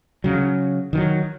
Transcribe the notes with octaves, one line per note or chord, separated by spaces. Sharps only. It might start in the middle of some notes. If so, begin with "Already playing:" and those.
C#3 F#3
D#3 E3 F#3